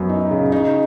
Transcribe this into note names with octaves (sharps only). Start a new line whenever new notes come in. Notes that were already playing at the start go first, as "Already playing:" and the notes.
Already playing: F#2 B3
D#4
C#3
D#4